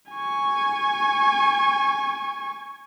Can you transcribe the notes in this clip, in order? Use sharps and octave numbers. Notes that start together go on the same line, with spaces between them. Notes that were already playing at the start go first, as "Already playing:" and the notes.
G#5 C#6